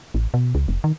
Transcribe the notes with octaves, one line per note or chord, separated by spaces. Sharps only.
A1
B2
C#2
F1
D#3